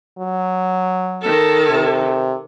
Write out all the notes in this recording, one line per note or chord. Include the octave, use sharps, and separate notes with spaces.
F#3
D#3 A4
C3